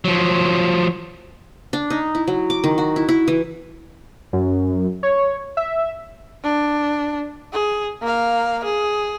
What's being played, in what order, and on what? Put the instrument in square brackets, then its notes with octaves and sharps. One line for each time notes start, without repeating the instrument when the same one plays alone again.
[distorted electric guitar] F3 F#3
[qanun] D4
D#4
E4
F#3
D6
D#3
F#4
E4
E4
E3
[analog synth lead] F#2
C#5
E5
[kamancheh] D4
G#4
A#3 F5
G#4